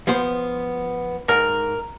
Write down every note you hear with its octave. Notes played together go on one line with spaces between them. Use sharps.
F3 B3 C5
G#2 A#4